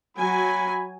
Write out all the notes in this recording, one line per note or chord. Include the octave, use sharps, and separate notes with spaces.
F#3 G#5 B5